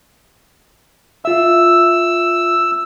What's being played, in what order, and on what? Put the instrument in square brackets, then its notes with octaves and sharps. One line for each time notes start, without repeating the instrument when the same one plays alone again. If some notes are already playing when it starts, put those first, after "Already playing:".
[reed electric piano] F4 E5 [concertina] E6